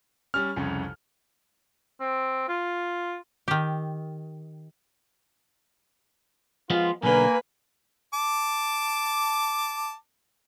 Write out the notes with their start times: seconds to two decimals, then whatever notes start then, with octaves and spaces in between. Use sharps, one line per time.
0.34 G3 C#4 F6
0.56 C2 F2 C#3
2.00 C4
2.48 F4
3.48 D#3 G4
6.70 F3 G#3 B3 F4
7.03 B1 D3 A#3 B4 G#5
8.14 A5 D6